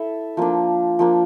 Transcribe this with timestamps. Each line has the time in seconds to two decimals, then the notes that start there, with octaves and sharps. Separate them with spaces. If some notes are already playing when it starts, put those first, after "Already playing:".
Already playing: E4 A4 E5
0.37 F3 A#3 D4
0.99 F3 A#3 D4